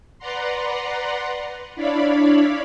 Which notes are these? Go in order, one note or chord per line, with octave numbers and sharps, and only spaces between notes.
B4 D5 F#5 A#5 C6
D4 E4 C#5 D5 F5 B5